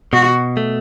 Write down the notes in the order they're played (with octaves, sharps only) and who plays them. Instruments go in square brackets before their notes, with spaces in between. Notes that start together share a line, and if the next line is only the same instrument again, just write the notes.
[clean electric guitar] B2 [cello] F#4
[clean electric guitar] A3